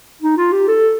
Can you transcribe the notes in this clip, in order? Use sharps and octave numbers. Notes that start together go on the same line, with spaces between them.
D#4
F4
G4
A4